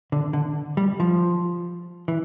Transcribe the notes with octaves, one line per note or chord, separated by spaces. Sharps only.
D3
D3
G3
F3
E3